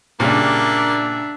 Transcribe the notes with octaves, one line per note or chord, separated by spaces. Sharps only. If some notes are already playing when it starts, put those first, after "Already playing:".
G2 A#2 C#3 A#3 D4 E5